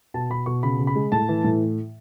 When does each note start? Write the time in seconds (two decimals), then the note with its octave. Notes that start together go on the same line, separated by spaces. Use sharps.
0.14 B2 A5
0.30 B2 B5
0.46 B2 C#6
0.63 C#3 B5
0.79 C#3
0.87 B5
0.96 G#3
1.12 A2 A5
1.29 E3
1.44 A2